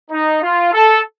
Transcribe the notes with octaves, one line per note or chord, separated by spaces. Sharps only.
D#4
F4
A4